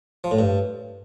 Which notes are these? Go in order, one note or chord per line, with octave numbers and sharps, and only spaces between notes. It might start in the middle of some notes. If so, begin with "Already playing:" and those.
F3
A2
G2